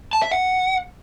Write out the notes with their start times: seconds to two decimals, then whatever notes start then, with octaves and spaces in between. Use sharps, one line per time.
0.13 A5
0.22 E5
0.31 F#5